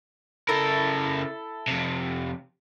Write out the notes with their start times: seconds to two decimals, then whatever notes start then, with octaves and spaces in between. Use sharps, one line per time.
0.49 C#3 E4 A4 A#4
1.68 F2 C3